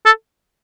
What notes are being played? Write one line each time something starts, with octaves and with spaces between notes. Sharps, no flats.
A4